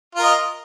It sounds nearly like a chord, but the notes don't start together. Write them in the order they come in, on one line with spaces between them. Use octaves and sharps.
F4 A#4 D#5